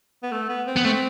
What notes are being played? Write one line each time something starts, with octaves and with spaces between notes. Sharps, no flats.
B3
A3
B3
C4
B3
A3 C4